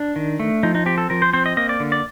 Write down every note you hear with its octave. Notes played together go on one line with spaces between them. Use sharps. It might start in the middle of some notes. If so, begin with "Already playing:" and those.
Already playing: D4
D#3
A3
F3 D#4
D#4
C4 G4
A4
F3 A#4
C5
C4 C5
D#5
A#3 D#5
D5
D3
D5